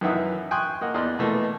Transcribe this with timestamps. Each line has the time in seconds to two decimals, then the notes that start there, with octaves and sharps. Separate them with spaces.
0.01 F#2 D#3 E3 E5 F#5 D#6
0.51 G5 G#5 C6 C#6 D#6 F#6
0.81 A#3 D#5 F#5
0.94 E2 D5 D#5 C6 F#6
1.19 B2 E3 A3 A#3